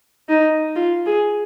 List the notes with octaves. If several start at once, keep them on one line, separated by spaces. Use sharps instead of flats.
D#4
F4
G#4